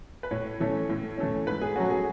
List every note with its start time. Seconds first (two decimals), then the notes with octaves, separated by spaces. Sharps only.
0.23 B4
0.31 A2 C#5
0.60 E3 A3 C#4
0.89 A2
1.18 E3 A3 C#4
1.47 G#2 B4
1.62 G#4
1.76 F#3 A3 C#4 F#4
1.90 G#4